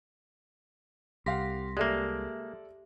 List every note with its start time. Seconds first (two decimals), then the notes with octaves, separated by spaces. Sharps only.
1.26 C2 G4 F5 F#5 C6 A#6 B6
1.77 G#3 A#3 G4 A4 D5 E5